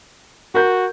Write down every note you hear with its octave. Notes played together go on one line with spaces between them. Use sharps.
F#4 A#4 G6